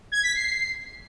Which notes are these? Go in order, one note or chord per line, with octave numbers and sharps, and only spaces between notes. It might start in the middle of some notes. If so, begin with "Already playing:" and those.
G#6
B6
C7